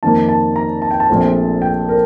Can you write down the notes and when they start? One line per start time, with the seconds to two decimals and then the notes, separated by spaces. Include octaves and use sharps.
0.03 F2 D#3 A#3 A5
0.29 A5
0.56 A#5
0.82 A5
0.91 G5
1.00 A5
1.10 A#1 A#2 A3 C4
1.62 G5
1.89 A#4